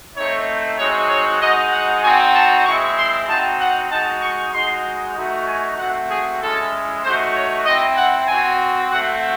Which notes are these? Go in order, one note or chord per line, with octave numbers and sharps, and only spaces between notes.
A3 C4 D#4 C#5
G#3 C4 D#4 F#4 C#5
C#5
G#3 D#4 F#4 D#5
F#5
C4 D#4 F#4 G#5
A5
G#3 C4 E4 C#6
C6
C4 D#4 F#4 A5
F#5
G#3 D#4 F#4 A5
C#6
G#3 D#4 F#4 C6
A3 D#4 F#4
G#5
A3 C4 F#4 F#5
G#4
G#3 C#4 E4 A4
A3 D#4 F#4 C5
C#5
C4 E4 D#5
F#5
C4 F#4 G#5
A3 C4 F#4 F#5